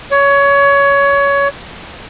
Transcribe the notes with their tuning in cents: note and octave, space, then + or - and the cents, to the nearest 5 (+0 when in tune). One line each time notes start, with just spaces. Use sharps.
C#5 +20